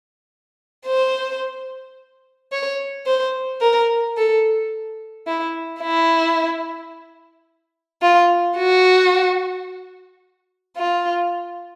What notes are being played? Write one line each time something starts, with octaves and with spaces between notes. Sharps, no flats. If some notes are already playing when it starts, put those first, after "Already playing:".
C5
C#5
C5
A#4
A4
E4
E4
F4
F#4
F4